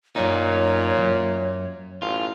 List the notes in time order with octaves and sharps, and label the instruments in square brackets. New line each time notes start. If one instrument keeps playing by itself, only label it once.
[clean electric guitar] F#2 D#4 [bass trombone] A#2 [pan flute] C#5
[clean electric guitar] C#2 F#2
[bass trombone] A1 [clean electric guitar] F4